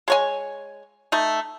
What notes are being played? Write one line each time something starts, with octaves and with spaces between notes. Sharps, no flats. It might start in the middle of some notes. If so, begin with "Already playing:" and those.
G#3 C#5 G#5
A3 D#4